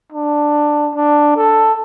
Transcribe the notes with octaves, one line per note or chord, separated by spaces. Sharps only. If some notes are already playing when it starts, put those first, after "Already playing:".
D4
D4
A4